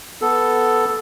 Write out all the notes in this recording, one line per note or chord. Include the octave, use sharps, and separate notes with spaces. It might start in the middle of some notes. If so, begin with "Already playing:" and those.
B3 A4